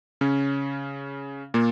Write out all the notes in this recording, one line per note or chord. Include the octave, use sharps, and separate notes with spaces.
C#3 C#4
A#2 A#3